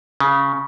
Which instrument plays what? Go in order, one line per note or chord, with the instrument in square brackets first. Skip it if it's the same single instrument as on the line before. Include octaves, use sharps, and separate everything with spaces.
[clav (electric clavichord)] C#3